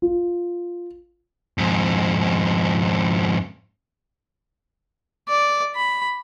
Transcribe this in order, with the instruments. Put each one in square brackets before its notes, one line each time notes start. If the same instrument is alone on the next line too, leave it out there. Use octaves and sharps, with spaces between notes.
[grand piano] F4
[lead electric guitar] F2 G#2
[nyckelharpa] D5
B5